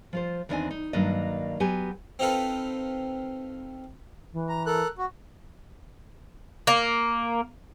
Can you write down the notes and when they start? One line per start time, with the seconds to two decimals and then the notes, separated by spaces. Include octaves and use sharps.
0.13 F3 F4 C5
0.49 E2 D#3 C4 D4 D#5 G#5
0.71 D#4
0.93 G2 D#3 F#3 A#3 D4 D#5
1.60 F#3 B3 G4 G#5
2.19 C4 D#4 F4 A4 B4
4.32 E3
4.49 A#5
4.66 A4 A#4 F#6
4.98 F#4
6.67 A#3